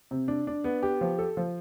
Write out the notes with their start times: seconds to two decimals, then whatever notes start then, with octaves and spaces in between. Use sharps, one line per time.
0.11 C3
0.28 D4
0.47 D4
0.64 B3
0.83 G4
1.01 F3
1.19 A4
1.37 F3